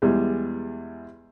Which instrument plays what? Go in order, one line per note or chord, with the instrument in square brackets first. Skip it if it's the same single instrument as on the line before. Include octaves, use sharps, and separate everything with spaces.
[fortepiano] E2 G3 G#3